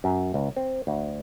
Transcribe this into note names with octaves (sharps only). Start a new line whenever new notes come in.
F#2
C#2
C4
D2